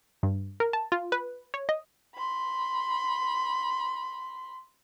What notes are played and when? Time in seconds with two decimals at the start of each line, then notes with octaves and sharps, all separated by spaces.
0.23 G2
0.60 A#4
0.73 A5
0.92 F4
1.12 B4
1.54 C#5
1.69 D#5
2.15 B5 C6